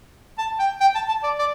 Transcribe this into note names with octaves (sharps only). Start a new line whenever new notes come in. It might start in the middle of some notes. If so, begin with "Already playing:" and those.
A5
G5
G5
A5
A5
D5
D5